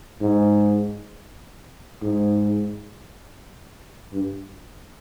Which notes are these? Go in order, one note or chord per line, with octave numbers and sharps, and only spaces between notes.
G#2
G#2
G2